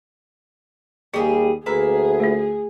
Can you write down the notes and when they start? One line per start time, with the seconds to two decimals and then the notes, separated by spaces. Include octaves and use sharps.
1.14 D#2 G3 G4 G#4
1.66 D2 A#3 G#4 B4 E5
2.20 A3 F4